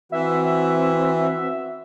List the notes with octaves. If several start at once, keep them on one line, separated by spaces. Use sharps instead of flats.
E3 C4 F#4 E5